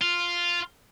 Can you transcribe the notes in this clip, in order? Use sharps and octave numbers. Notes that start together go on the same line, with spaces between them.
F4